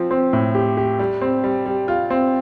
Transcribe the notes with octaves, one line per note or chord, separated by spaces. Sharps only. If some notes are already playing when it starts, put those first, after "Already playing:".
Already playing: F3 C4
C4
A2
G4
G4
G3
C4
G3
G3
F4
C4